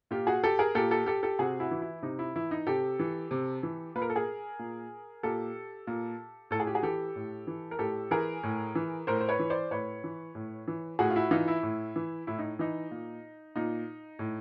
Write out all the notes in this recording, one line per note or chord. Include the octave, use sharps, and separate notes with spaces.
A#2 F4 G4
F#4 G#4
G4 A4
G#4 A#4
A#2 G4 A4
G4 A4
G4 A4
G4 A4
C3 F#4 G#4
E4 F#4
E3
E4
C3 D#4
E4
E3 E4
D#4
C3 G4 A4
E3
C3
E3
A#2 B4
A#4
A4
G#4 A#4
A#2
A#2 G4 A4
A#2
A2 A4
G#4
G4
F#4 G#4
E3 G4 A4
A2
E3
A#4
A2 G4 A4
E3 G#4 A#4
A2
E3
A2 A#4 C5
C5
B4 C#5
E3
C5 D5
A2 B4 C#5
E3
A2
E3
A2 F#4 G#4
F4
E4 F#4
E3 D#4 F4
E4
A2
E3
A2 E4
D#4
E3 D#4
A#2
A#2 D#4
A2